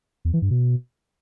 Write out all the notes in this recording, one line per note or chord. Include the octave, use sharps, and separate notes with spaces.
E2
E3
G2
B2